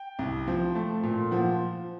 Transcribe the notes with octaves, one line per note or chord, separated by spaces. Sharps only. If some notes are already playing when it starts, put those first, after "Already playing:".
Already playing: G5
C2
F3
A3
A#2
F3 F#5